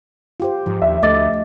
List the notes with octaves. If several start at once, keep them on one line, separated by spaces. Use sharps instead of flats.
F4 G4 C5
G#2 F3
D#2 E5
D2 A3 D#5 D6 A6